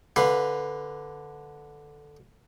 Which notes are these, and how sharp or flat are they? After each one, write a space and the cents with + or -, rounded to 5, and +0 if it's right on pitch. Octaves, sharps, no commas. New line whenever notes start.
D3 +0 B4 +5 F5 +10